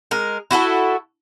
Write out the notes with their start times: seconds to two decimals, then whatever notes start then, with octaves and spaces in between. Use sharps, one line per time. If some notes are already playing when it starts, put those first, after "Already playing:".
0.11 G#3 A#4
0.51 E4 F#4 G4 A4